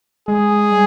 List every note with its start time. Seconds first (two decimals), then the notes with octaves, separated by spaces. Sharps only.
0.28 G#3 G#4
0.71 G3